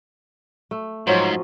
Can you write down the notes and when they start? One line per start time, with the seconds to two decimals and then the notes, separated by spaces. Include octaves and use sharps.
0.71 A3
1.07 G#2 F3 F#3 C#4